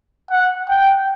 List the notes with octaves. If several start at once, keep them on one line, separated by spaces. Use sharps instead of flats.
F#5
G5